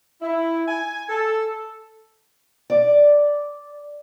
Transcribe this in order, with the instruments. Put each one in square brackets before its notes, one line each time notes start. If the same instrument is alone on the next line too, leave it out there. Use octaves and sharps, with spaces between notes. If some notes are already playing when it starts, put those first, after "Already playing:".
[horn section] E4
G#5
A4
[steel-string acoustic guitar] D5